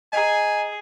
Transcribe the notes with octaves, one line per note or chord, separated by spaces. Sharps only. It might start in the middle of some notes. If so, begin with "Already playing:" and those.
G#4 D#5 G#5 A#5